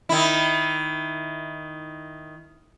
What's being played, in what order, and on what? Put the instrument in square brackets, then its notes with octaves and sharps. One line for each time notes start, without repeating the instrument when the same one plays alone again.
[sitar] D#3 E4